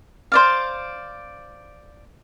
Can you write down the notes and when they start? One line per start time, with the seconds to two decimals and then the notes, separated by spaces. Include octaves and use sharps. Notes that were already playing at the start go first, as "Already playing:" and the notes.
0.32 C5 D5 F5